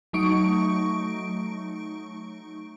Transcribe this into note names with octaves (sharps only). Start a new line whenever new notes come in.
F#3 A3 D#4 C#6 D7